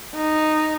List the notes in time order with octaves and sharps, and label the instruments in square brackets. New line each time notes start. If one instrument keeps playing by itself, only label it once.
[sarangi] D#4